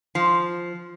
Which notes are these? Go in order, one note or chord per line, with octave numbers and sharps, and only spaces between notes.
F3